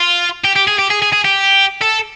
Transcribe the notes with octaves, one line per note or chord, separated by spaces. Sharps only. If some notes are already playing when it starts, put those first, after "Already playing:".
Already playing: F4
G4
G4
G#4
G4
G#4
G#4
G#4
G4
A4